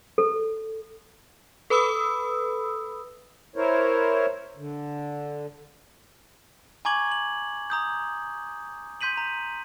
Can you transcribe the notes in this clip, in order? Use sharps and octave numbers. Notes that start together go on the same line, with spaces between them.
A4
A4 B4 B5 D#6 E6
E4 A#4 C5 C#5
D3
G#5 A#5 C#6 D6 G#6 F#7
F#7
A#5 D#6 G6
C6 G6 B6 D#7 F#7
A#5